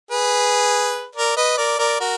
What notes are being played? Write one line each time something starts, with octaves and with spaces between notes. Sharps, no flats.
G#4 B4
A#4 D5
B4 D#5
A#4 D5
A#4 D5
F#4 A#4